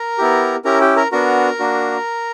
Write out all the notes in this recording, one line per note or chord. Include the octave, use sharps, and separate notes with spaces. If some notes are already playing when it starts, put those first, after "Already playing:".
Already playing: A#4 A#5
B3 E4 G4
C#4 E4 G4 A#4 A#5
G4 G5
A#4 A#5
B3 D4 F#4 A#4 A#5
A#3 D4 F#4